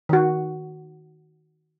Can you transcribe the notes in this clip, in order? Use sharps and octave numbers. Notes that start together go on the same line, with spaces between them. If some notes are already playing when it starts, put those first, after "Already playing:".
D#3 F#4